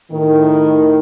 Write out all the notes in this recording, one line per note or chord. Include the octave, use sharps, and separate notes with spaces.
A2 D#3